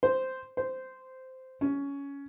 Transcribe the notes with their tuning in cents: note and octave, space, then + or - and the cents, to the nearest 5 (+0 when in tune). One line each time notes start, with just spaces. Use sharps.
C5 -5
C5 -10
C#4 +15